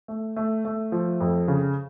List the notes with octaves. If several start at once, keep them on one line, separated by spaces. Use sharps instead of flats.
A3
A3
A3
F3
F2
C#3